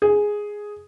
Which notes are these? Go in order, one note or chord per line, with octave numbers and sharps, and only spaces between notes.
G#4